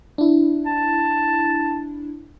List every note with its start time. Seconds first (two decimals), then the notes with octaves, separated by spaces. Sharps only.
0.18 D4 E4
0.67 A5